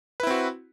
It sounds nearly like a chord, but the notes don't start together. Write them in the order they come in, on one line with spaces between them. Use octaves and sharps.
B4 E4 C4 F#4